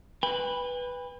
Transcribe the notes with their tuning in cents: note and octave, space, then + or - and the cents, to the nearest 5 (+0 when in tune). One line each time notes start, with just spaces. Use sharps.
B4 +0 G5 +45